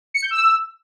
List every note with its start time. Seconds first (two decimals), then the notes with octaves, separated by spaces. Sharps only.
0.14 C#7
0.22 G6
0.31 E6